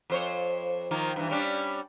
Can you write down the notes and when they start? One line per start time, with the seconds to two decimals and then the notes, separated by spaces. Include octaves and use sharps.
0.10 F2 C5 C#5
0.91 D#3 F3 A#3
1.16 G2 E3
1.30 G3 C#4 D4